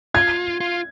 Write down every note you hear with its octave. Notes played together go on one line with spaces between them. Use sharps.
F4 G#6
F4